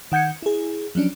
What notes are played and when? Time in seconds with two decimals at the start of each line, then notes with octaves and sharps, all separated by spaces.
0.12 D#3 F#5 G6 G#6 C#7
0.42 E4 G#4
0.95 F3 F#3 C#4 D4